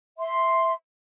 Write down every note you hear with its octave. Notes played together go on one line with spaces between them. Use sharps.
E5 C6